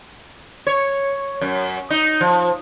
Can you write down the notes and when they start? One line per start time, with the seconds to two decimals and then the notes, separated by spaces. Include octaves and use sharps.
0.67 C#5
1.41 F#2
1.90 D#4
2.21 F3